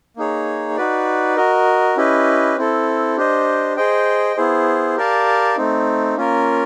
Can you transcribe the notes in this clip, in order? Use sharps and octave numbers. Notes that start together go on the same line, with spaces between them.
A#3 D#4 G#4 C#5
D#4 F#4 B4 D5
F#4 A#4 D#5
C#4 E4 G4 B4 D#5
C4 E4 A4
D4 G4 C5 D#5
G#4 C5 D#5 G5
B3 E4 G#4 C5
G4 A#4 D5 F5 A5
A3 C4 D#4
A#3 C#4 F4 A#4